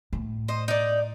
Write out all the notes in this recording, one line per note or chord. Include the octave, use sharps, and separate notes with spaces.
A2
C5 D#5
D#4 D5